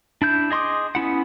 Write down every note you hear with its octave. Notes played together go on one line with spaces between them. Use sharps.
D4 E4 G6
G#4 D#5 C6 D6 D#6
B3 C#4 E4 F#5